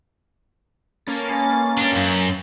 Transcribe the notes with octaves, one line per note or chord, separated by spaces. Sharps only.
A#3 C#4 A4 B4 A6
G#3 G#4 B5
C6
D4 G4
F#2 G5 C#6